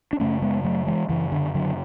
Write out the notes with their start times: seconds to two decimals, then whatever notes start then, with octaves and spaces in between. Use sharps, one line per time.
0.13 D4
0.20 F#2 C#3 A3 C#4
0.42 G#3 B3
0.65 F#3 A3
0.87 E3 G#3
1.09 F#2 C#3 E3
1.32 D3
1.55 D3 F#3